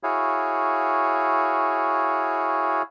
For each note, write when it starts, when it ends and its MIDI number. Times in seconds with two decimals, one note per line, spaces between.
0.03 2.82 64
0.03 2.82 66
0.03 2.82 68
0.03 2.82 73
0.03 2.82 77